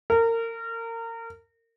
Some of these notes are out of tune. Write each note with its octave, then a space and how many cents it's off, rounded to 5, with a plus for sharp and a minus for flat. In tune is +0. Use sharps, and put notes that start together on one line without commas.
A#4 -30